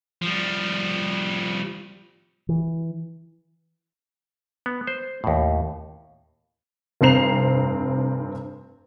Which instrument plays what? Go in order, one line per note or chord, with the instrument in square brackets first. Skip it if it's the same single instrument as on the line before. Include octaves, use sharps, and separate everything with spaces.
[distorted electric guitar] F3 G3
[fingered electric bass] E3
[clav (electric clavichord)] B3
C5
D#2 A2
[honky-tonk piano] F1 G2 C4 A#5 C7 F7